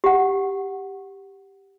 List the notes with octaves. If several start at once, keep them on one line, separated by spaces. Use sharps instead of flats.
G4 F#5